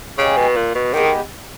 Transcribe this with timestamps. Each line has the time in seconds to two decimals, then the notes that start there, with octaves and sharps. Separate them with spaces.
0.18 C#3 G#3 C#4 G4
0.37 B2
0.56 A#2
0.75 B2
0.94 D#3 G#3 B3 G4